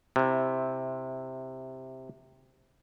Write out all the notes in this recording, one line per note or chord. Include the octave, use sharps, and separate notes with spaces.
C3 E4